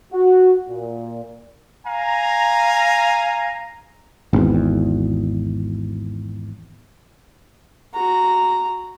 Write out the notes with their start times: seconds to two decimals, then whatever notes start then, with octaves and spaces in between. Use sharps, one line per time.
0.13 F#4
0.69 A#2
1.87 F5 G#5 A#5
4.33 G#1 E2
7.94 F#4 A#5